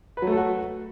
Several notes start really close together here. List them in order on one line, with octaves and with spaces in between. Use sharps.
B4 F#3 A3 A4 F#4